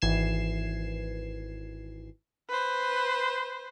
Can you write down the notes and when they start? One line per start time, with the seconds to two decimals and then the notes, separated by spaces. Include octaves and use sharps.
0.02 G#1 E3 G#6 C7 E7
2.49 B4 C5